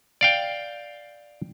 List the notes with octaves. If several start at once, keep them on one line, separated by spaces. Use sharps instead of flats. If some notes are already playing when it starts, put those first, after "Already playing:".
D5 F5 G5